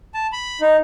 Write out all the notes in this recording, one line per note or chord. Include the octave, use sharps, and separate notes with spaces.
A5
B5
D#4